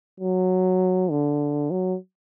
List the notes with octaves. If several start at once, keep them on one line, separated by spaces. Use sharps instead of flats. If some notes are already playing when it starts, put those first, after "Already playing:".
F#3
D3
F#3